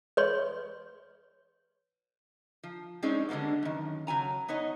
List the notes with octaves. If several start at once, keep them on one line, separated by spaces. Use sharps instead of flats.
B4 C#5 C6
F3
G#3 C4 C#4 D#4 G#4 D5
D3 G3 G#3 A#3 B3
F#2 D#3
C#3 F#3 G#5 A#5
B3 D#4 C#5 D#5